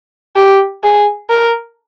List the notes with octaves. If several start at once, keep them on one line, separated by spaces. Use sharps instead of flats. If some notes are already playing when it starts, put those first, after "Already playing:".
G4
G#4
A#4